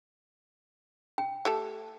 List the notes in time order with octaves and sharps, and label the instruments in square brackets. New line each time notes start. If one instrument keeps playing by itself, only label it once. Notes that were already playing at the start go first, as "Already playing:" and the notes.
[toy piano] G5
[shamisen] A3 G4 A4